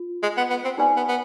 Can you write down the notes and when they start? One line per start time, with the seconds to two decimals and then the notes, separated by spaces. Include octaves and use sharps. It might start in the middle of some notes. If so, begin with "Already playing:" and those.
Already playing: F4
0.23 G#3
0.37 B3
0.50 B3
0.65 C4
0.78 B3 D#4 G4 B4 D5 G#5
0.97 B3
1.09 B3